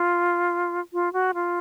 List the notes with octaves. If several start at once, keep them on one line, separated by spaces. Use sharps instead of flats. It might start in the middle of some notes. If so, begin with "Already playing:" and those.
Already playing: F4
F4
F#4
F4